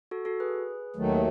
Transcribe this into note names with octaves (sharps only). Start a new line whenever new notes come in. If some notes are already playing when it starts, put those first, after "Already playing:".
F#4 A4
F#4 A4
G#4 B4
D#2 D#3 F#3 A3